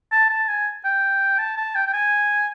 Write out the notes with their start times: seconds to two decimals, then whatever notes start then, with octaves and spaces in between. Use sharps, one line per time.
0.12 A5
0.30 A5
0.48 G#5
0.84 G5
1.38 A5
1.57 A5
1.75 G5
1.87 G5
1.93 G#5